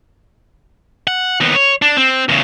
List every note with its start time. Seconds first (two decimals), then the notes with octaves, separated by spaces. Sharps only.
1.07 F#5
1.40 D#2 B3
1.55 C#5
1.82 D4
1.97 C4
2.29 E2 C#3